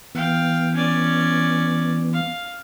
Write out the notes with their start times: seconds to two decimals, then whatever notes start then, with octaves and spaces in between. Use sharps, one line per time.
0.15 E3 B3 F5 G5
0.74 C#4 D5
2.13 F5